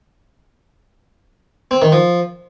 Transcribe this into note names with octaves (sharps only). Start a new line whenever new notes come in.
C4
D#3
F3